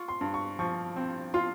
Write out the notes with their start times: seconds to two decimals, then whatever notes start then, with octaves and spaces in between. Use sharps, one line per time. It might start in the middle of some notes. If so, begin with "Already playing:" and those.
Already playing: F4 C#6
0.08 C6
0.21 G2
0.34 C#6
0.59 F3 C#6
0.96 C4
1.34 F4 C6